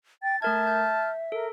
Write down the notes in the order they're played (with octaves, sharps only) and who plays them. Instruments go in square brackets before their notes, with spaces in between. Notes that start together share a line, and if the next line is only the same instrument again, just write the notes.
[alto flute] G5 [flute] A6
[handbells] A3 A#4 G#6 [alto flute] E5 [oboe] A5 [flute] F6
[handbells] G6
[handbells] A4 [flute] A#4